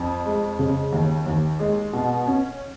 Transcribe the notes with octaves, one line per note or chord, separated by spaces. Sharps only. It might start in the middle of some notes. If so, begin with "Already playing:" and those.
Already playing: F2
G#3
C#3
D#2
D#2
G#3
B2
C#4